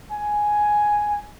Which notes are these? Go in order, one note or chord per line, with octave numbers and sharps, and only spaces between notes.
G#5